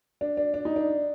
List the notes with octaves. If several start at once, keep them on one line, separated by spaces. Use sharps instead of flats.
D4
D4
D4
D#4
D4